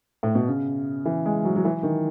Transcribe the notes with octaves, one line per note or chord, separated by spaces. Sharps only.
A2
B2
C#3
E3
G#3
F#3
F#3
E3
D#3